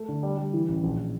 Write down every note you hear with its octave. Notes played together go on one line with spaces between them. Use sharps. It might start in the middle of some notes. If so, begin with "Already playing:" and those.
Already playing: A3
D3
G3
G3
E3
A1
A#1